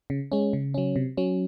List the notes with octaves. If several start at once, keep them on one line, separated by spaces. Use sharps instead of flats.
C#3
G#3 C#4
C#3
F#3 C#4
C3
F#3 C#4